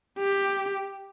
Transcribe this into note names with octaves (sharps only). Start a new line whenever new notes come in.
G4